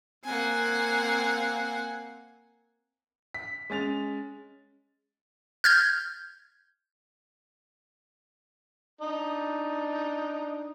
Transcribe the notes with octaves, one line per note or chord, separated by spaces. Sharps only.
A#3 C4 F#5 G#5
B6
G#3 C#4 A6 F7
F6 G6 G#6
D4 D#4